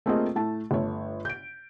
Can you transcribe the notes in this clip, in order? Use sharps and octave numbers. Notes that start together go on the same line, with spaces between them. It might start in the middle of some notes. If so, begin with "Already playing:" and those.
A3 A#3 C4 F4 G#4 D#5
A2 A3 A5
G1 A3 C#5
G6 D7